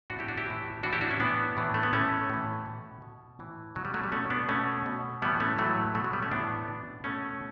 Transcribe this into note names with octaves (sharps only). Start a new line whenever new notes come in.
A2 E3 D4 F#4
E4 G4
D4 F#4
E4 G4
A2 E3
A2 E3 D4 F#4
E4 G4
D4 F#4
C#4 E4
A2 E3 B3 D4
A2 E3
A3
B3
A2 E3 A3 C#4
A2 E3
B2
B2
A2 E3
B2 F#3
G3
F#3 A3
G3
B2 A3 C#4
B3 D4
B2 A3 C#4
B2
A2 E3 G3 B3
A3 C#4
A2 E3 F#3 A3
B2 F#3 A3
F#3
G3 B3
A3 C#4
A2 E3 B3 D4
B2
B2 A3 C#4